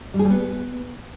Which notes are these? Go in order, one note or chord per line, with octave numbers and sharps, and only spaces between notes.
G3
G#4
G3
B3